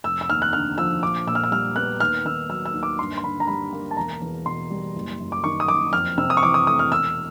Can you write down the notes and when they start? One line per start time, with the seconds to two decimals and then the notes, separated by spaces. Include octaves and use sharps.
0.04 F1 E6
0.21 E6
0.29 D#2 F6
0.42 F#6
0.53 D3 F6
0.78 F3 E6
1.02 A#1 D6
1.27 A#2 E6
1.35 F6
1.44 E6
1.51 G3 F6
1.76 B3 F#6
2.00 D#2 F6
2.25 D#3 E6
2.49 F#3 E6
2.65 E6
2.74 D#2
2.83 D6
2.99 G2 C6
3.18 C6
3.23 D3 B5
3.40 A#5
3.48 G3 B5
3.73 A#3
3.91 A5
3.97 E1 A#5
4.22 E2
4.46 B2 C6
4.70 G3
4.96 F#1
5.20 F#2
5.32 D6
5.44 D#3 C#6
5.60 D#6
5.68 F#1 D6
5.93 F2 F6
6.18 C3 E6
6.30 D#6
6.37 C#6
6.43 E3 D6
6.54 D#6
6.67 A3 D#6
6.79 F6
6.91 E1 E6